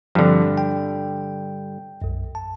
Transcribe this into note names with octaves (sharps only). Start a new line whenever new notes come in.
G2 D3 F3 C4
G5
B1 F#2
A5